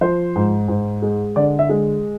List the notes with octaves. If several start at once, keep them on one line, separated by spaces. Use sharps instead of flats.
F3 C5
G#2
G#2
G#3
D3 D5
E5
G#3